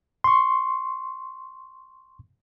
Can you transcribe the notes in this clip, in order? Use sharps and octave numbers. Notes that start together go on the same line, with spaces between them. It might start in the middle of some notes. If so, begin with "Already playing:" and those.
C6 C#6